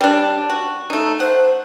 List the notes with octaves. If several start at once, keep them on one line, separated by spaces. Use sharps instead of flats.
G3 D4
F#4
A3 D#4
C5 F#5